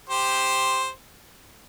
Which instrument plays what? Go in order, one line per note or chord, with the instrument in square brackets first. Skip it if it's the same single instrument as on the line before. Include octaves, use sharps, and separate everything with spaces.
[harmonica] G4 C5